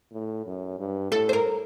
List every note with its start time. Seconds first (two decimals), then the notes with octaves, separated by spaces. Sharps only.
0.12 A2
0.46 F#2
0.79 G2
1.11 A2 A4
1.29 C5
1.33 A#4